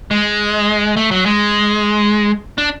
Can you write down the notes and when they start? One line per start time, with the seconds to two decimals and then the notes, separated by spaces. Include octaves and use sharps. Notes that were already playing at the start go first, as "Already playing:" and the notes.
0.11 G#3
0.97 A3
1.11 F#3
1.26 G#3
2.58 D4